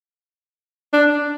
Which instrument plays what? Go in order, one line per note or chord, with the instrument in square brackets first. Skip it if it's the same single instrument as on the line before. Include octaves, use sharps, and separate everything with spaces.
[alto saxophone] D4